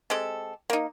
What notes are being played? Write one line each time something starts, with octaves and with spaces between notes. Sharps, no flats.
G#3 C4 G4 A4
A#3 D#4